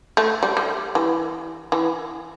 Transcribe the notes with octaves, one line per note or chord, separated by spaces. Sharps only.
A3
G3
G3
E3
E3